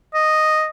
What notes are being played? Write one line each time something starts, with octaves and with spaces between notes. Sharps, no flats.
D#5